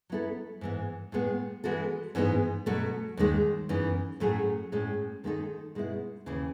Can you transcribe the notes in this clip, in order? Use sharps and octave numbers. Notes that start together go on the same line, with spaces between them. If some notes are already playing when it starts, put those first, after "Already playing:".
F#3 B3 E4 A4
G#2 E3 B3
A2 G#3 B3
E3 G#3 B3 F#4 A4
G#2 E3 B3 D#4 G#4
B2 F#3 A3
D#2 D#3 G#3 D#4
F#2 E3 B3 D#4
A2 F#3 A3 C#4 G#4
A2 G#3 C#4
D#3 G#3 B3 D#4 A4
B2 G#3 B3 E4
D#2 C#3 E3